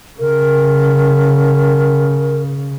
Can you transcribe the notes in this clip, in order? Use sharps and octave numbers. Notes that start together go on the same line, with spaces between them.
C#3 A#4